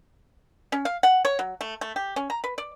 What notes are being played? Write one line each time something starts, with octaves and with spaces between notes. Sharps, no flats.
C#4
F5
F#5
C#5
F#3
A3
A3
G4
C#4
A#5
B4
D5